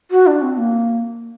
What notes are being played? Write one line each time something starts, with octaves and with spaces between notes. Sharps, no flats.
F#4
D4
C4
A#3